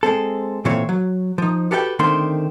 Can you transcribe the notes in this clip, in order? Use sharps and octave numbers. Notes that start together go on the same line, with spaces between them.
G#3 C4 A4
A#2 E3 A3 C4 C#5
F#3
F3 D#4
F#4 G4 A4 B4 F5 G5
D3 D#3 A3 C4 C6